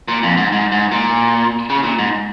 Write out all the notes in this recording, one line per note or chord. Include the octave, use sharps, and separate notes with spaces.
A#2
F2
G#2
G#2
G#2
A#2
C#3
A#2
G#2